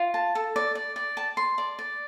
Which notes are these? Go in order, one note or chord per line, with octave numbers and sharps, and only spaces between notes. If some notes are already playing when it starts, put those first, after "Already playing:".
Already playing: F4
A5
A4
D5
D5
D5
A5
C6
D5
D5